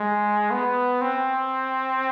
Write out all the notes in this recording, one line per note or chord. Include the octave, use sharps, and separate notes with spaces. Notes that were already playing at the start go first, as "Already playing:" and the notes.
Already playing: G#3
B3
C4